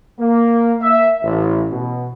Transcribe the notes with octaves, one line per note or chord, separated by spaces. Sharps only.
A#3
E5
A1
B2